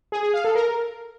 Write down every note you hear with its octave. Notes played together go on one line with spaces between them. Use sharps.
G#4
G#4
F5
A4
A#4